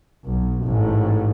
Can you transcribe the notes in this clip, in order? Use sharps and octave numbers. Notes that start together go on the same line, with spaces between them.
B1
A1 G#2